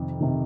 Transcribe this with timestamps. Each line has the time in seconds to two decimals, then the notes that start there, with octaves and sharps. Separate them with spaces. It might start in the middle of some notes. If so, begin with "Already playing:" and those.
Already playing: F2 C3 D#3
0.21 C3 D#3